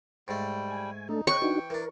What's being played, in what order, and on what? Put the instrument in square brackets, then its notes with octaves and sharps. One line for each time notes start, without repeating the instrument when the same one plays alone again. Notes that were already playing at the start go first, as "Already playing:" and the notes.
[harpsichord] G#2 A3 [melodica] G3 G5
[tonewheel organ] G#5
[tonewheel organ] A3 D4 A4 [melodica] D#4
[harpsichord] C#3 D#4 [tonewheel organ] C#5 F#6 [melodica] G5 [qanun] C#6
[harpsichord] E3 [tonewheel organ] D4 D#4 F#4
[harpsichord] E3 D4 [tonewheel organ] A#4